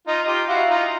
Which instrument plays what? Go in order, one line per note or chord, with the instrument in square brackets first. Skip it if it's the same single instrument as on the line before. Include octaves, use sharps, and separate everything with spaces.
[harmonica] D#4 F4 [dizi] D#5
[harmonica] F4 G4
[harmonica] E4 F#4 [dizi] F5
[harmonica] D#4 F4